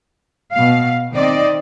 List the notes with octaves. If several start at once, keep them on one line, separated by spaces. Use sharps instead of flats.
B2 F5
D#3 C4 D5 D#5